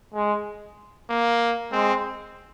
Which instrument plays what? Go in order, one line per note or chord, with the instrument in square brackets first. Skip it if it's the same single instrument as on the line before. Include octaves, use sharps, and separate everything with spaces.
[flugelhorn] G#3
[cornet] A#3
[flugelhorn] G#3 [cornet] C4